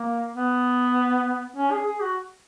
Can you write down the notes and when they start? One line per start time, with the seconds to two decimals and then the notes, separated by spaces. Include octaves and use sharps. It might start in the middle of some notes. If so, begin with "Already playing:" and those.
Already playing: A#3
0.35 B3
1.56 C#4
1.71 G#4
1.86 G#4
2.02 F#4